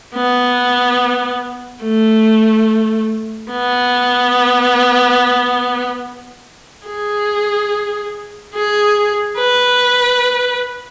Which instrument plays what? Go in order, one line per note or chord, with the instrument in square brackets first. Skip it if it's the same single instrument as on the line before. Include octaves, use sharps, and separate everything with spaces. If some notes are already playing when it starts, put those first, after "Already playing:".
[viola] B3
A3
B3
G#4
G#4
B4